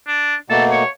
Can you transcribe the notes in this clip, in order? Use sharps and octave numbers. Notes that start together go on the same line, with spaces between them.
D4
B2 A3 A#3 A4
C#5